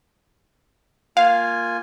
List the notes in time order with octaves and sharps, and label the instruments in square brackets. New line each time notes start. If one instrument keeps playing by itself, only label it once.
[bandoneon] A#3 F4 G#5 [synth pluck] F5